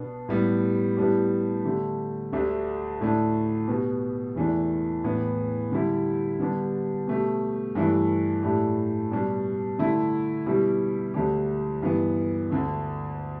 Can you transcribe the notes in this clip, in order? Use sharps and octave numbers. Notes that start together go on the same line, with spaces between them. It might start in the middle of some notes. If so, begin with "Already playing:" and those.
Already playing: B2 B3 D4
A2 G3 B3 G4
A2 G3 B3 D4 G4
D3 A3 G4
D2 D3 A3 D4 G4
A2 A3 D4
B2 B3 G4
E2 E3 A3 D4
A2 E3 B3
D3 G3 E4 G4
D3 G3 B3 D4 G4
B2 A3 G4
G2 E3 A3 D4
A2 A3 D4 G4
B2 G3 D4 G4
D3 A3 E4
B2 G3 E4 G4
D2 D3 A3 D4 G4
G2 E3 B3
D2 D3 A3